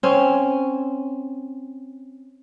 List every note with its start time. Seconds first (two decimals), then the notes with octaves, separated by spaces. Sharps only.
0.03 C4 C#4